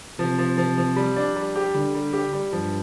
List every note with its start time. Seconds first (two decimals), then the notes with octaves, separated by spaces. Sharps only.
0.19 C3 F3
0.39 F3
0.58 F3
0.78 F3
0.96 G3
1.16 D4
1.36 G3
1.56 G4
1.74 D3 G3
1.94 G3
2.13 G4
2.33 G3
2.52 G2 F3